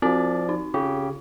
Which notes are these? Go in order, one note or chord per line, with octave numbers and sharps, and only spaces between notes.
F3 C4 F#4 D5
D#4
C#3 F4 G4